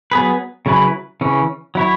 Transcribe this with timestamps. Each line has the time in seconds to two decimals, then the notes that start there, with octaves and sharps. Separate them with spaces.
0.12 F#3 B3 G#4 B4
0.66 C#3 F#3 C#4 E4 B4
1.21 C#3 E3 C#4
1.75 F#3 E4 C#5